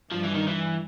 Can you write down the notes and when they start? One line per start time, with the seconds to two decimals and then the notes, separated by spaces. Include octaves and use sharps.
0.11 G2 F3
0.24 E3
0.35 D#3
0.47 E3